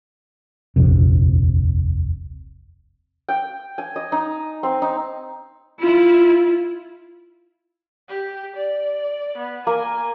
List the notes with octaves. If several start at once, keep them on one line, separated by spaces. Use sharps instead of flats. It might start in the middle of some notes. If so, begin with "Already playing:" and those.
D#1 A#1 F2 C3
G5
G#5
D#5
D#4
C4
D#4
E4 F4
G4
D5
B3
A#3 G#5